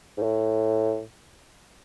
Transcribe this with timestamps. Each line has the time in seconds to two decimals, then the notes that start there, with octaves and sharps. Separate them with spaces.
0.18 G#2
0.23 A2